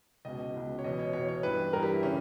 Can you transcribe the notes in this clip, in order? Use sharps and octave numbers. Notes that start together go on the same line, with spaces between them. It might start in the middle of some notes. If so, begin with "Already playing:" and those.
C#2 B2 D#5
C#2 B2
C#5
E2 B2 D#5
C#5
E2 B2 C#5
C#5
G2 E3 B4
G2 E3 A#4
G4
E4
C#3 E3 C#4